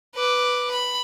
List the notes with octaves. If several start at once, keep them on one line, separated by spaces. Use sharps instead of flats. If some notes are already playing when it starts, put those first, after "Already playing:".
B4 D6
B5